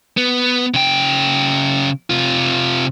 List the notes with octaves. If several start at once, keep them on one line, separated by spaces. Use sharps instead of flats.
B3
C#3 G5
C3 F4